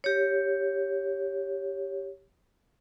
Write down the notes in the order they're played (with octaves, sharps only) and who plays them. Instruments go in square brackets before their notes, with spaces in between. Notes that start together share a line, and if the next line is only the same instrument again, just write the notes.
[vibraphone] G4 C#5